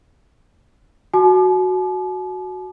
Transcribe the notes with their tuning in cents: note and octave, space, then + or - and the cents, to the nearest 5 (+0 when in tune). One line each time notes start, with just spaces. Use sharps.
F#4 +0 A5 -45 D6 +35